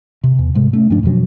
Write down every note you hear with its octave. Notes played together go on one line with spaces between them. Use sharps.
C3
E2
G#2 C3 G#3
A3 C#4
G2 F3 D4
F2 B2 F3 F#3